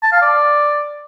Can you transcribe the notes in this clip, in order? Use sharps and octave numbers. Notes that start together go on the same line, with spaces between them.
A5
F5
D5